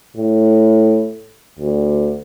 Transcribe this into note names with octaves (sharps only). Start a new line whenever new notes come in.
A2
D2